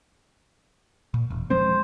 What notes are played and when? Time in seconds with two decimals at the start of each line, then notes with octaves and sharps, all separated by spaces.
1.14 A#2
1.30 E1
1.50 F3 G#3 C4 C5